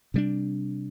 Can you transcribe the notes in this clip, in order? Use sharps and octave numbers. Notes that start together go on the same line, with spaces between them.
C3 G3 D4